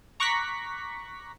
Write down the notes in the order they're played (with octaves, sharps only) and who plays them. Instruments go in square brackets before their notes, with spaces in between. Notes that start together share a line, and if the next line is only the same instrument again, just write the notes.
[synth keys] A#5 C#6 D6 F#6 A#6 B6